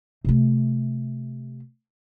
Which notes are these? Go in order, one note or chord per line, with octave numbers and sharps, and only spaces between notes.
C3 A3